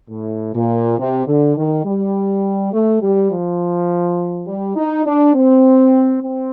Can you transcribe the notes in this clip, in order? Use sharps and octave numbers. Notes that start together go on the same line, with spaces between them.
A2
A#2
C3
D3
D#3
G3
A3
G3
F3
G3
D#4
D4
C4
C4